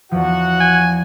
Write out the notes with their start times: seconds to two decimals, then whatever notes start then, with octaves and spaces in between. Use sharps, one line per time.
0.11 E2 F3 F#4 F#5
0.60 G#5